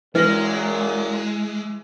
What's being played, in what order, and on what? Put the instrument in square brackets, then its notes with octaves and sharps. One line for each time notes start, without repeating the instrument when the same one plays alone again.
[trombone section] F#2 A#2 [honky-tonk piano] E3 A#6 F#7 [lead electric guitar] G#3 [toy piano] B4